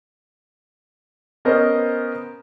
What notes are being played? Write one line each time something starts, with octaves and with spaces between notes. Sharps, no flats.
B3 C#4 A#4 C5 D#5